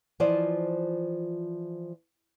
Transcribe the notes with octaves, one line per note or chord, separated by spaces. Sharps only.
E3 F3 F4 C5 D5 D#5